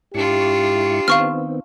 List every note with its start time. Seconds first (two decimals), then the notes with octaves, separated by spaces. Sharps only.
0.14 G#2 D4 E4 F4 G4 C#6
1.08 D#3 B3 C4 F5 C#6 F6